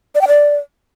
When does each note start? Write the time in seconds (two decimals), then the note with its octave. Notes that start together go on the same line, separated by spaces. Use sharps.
0.15 D5
0.21 G5
0.28 D5